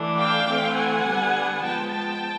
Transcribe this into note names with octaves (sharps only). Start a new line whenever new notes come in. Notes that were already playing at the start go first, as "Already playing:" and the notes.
Already playing: E3 A3 D4
F5 G5
E3 A3 C4
F#5 G#5
D3 G3 B3 D4
F3 G#3 B3 G5 A5
G5 A5